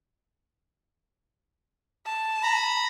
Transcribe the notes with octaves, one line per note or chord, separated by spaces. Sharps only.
A5
A#5 B5